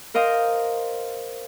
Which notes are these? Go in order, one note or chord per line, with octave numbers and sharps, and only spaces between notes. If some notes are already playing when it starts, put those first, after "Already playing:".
A#4 C5 D#5 F5